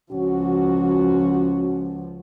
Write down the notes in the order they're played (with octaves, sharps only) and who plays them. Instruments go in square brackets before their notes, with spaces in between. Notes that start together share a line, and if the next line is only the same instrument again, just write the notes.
[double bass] C#2 F3 [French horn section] C#4 F#4